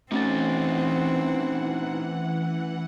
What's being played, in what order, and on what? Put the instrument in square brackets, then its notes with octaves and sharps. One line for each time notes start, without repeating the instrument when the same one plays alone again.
[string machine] E3 F#5 [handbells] A3 C#4 A6 [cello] C4 [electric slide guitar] D#4 F#4